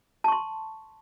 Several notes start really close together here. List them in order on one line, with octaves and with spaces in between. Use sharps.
A5 C#6 C6